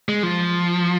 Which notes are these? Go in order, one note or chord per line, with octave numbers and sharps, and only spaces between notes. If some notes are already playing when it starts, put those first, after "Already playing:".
G#3
F3